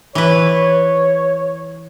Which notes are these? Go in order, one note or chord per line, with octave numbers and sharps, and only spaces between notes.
E3 B4 C#5